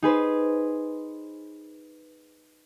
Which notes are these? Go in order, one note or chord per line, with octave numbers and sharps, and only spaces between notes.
D#4 G#4 B4 C5